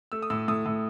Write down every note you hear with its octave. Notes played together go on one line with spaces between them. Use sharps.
A3 E6
D#6
A2 E6
A2 D#6
A2